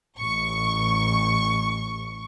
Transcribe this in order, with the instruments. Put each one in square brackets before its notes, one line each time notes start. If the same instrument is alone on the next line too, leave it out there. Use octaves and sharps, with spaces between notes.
[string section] A1 C#6